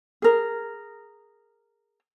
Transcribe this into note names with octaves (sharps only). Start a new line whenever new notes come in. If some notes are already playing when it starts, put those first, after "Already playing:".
G#4 A#4